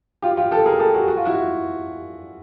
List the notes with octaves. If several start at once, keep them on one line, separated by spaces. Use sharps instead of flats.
F4 G4
F4 G4
G4 A4
G#4 A#4
G4 A4
F#4 G#4
F#4
F4
E4 F#4